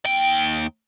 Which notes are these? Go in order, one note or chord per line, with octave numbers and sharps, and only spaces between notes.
D#2 G5